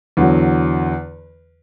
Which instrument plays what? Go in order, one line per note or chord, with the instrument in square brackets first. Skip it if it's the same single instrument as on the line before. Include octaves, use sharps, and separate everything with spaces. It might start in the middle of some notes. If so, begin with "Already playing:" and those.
[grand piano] E2 D3 F#3